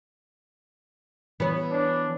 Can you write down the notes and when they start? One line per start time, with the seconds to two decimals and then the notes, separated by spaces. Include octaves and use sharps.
1.40 E3 B3 C#5
1.71 D4